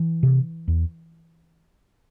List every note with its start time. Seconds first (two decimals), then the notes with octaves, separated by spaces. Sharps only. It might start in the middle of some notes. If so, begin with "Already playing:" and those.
Already playing: E3
0.23 C3
0.68 E2